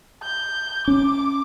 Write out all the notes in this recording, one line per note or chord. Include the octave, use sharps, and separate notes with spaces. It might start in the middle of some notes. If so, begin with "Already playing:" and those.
G6
C#4 D6